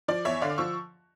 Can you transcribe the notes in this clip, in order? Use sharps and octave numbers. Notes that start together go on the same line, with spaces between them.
F3 D5
E2 C#5 E5
D3 D5 F5
D6
F3 C#6 E6